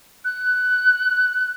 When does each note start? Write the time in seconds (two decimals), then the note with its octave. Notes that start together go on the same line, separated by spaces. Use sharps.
0.25 F#6